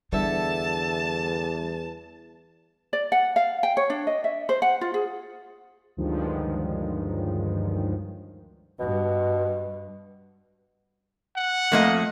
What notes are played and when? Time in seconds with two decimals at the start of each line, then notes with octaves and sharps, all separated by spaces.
0.13 E2 D3 G3 A4 E5 A5
2.93 D5
3.12 F#5
3.36 F5
3.63 G5
3.77 C#5
3.90 D4
4.07 D#5
4.24 E5
4.49 C5
4.62 F#5
4.81 F4
4.94 G#4
5.97 D2 G2 D#3 F3 F#3 G#3
8.79 G2 B2
11.36 F#5
11.72 F2 A3 A#3 D#5